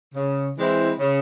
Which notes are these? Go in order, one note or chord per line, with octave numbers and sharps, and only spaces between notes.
C#3
E3 G#3 C4 E4
C#3